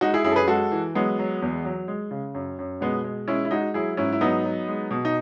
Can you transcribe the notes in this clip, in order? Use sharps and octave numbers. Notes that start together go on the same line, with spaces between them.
G#3 D#4 F#4
E4 G#4
F#2 E4 G#4
A4
G#4 B4
G#3 F#4 A4
E3
F#3 G#3 B3
F#3
E2
F#3
G#3
C#3
F#2
F#2
B2 G#3 B3
G#3
G#3 C#4 E4
E4
G#3 D#4 F#4
F#3 E4 G#4
G#2 C#4 E4
E4
F#3 B3 D#4
F#3
G#3
B2
D#4